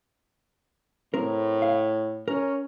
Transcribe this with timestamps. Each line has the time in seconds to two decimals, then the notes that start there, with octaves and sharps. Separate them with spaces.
1.14 A2 C4 A#4
1.62 F5
2.28 C#4 A#4